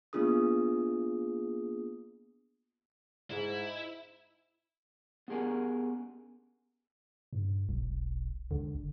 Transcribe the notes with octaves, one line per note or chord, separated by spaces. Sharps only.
A#3 B3 D4 F4 G#4 D#6
G#2 E4
B3 C#4 G4 G#4 A#4 G#5
G2
E1 B1
C#2 D3
F#1